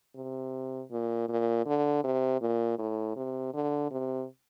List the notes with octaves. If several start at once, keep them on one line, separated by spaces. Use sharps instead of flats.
C3
A#2
A#2
D3
C3
A#2
A2
C3
D3
C3